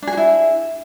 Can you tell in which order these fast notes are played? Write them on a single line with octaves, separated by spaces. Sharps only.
D4 G#4 F#4 E4